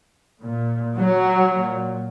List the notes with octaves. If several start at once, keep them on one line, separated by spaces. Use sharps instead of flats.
A#2
F#3
A#2